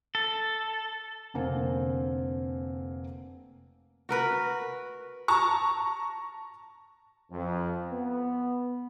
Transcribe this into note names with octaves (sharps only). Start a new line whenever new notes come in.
A4
F1 D3 A#3 C4 F5 G#5
F#4 A#4 B4
A5 A#5 C#6
F2
B3